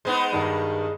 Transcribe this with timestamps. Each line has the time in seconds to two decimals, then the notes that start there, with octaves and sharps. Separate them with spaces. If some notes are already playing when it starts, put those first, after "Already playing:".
0.05 G#3 B3 D#4 C5
0.32 G2 D#3 G3